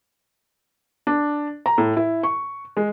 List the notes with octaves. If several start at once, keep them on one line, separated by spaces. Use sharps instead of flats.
D4
A#5
A2
E4
C#6
G#3